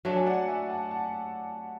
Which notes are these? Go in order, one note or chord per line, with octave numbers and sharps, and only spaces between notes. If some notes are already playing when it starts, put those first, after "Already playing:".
F#3 A3 D4 C#5 E5
G#5
D5 F#5
E5 G#5
F#5 A5
F#5 A5